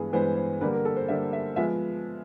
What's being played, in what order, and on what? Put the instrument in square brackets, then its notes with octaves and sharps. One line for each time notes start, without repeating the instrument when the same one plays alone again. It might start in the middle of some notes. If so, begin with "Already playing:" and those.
Already playing: [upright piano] G2 E3 G#3 B3 G#4
G2 E3 G#3 B3 C5
C5
D3 G3 A#3 B4
A#4
A4
C5
D3 G3 A#3 E5
E5
F3 G#3 B3 E5